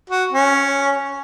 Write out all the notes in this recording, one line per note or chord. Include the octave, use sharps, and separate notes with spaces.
F#4
C#4